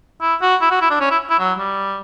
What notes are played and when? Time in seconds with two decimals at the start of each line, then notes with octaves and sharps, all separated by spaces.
0.22 E4
0.42 F#4
0.61 E4
0.71 F#4
0.81 E4
0.90 D4
1.00 C#4
1.11 E4
1.30 E4
1.39 F#3
1.59 G3